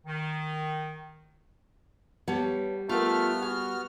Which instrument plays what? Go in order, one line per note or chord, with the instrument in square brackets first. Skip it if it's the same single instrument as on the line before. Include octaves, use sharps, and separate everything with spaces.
[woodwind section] D#3
[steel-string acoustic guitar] G3 [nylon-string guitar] B3 C#5 A5
[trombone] A3 [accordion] B3 F6 [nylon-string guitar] F4 G4 A#4
[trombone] F#4 [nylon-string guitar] G#4